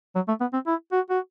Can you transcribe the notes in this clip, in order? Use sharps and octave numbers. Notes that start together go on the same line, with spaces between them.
F#3
A3
B3
C4
E4
F#4
F#4